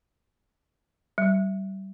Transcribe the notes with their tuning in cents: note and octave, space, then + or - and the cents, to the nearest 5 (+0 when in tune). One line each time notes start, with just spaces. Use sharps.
G3 -25